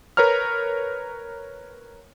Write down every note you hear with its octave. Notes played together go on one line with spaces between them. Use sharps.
A#4 B4 C#5 A#5 F6